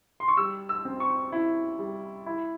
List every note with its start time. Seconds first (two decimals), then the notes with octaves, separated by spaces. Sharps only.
0.20 C6
0.28 C#6
0.37 G3 E6
0.69 E6
0.85 C4
1.00 C#6
1.32 E4
1.79 G3
2.26 E4